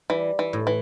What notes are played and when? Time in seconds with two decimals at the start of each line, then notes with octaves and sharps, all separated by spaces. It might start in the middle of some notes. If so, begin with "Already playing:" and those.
0.10 E3 G3
0.39 E3
0.53 A2
0.67 E3